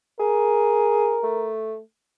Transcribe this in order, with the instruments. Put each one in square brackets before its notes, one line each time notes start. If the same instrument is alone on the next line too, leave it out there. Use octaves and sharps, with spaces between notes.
[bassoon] G#4 [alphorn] A#4
[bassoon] A3